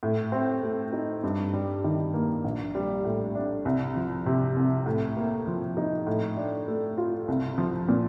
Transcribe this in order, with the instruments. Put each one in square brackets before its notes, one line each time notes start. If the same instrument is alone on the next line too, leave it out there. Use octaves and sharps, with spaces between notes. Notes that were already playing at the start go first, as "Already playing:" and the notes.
[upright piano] A2
C4
A3
D#4
G2
G3
D#3
A#3
A#1
G3
A2
D4
C2
F3
C3
C2
A2
A#3
F3
D#4
A2
D4
A3
F4
C2
F3
A#2